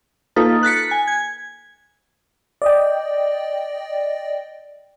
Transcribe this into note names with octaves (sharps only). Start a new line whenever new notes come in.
A#3 D#4 F4 A4 B4
F#6 A6 B6 C#7
G#5
G#6
D5 D#5 G5